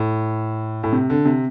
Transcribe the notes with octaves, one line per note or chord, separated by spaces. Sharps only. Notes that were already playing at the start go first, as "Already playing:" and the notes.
Already playing: A2
A2
C3
D3
C3